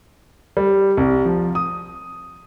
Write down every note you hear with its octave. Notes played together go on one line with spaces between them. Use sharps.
G3
C2
F3
D#6